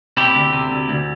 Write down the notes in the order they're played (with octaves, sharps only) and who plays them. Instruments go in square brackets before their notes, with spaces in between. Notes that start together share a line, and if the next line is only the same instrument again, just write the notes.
[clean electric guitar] C3 E4 G4
D2
C3
D2
D2